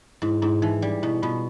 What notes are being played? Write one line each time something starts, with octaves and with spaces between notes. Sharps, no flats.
G#2 E4
G#2 E4
E3 D#4
G3 D4
B2 E4
B2 F4